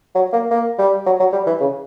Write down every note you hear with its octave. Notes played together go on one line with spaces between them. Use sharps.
F#3
A#3
A#3
G3
F#3
F#3
G3
E3
C#3